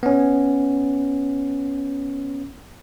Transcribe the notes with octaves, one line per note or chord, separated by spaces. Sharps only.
B3 C#4